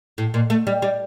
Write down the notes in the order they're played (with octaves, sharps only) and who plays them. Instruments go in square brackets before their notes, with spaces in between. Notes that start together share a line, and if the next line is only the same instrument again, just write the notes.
[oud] A2
A#2
A3
G3
G3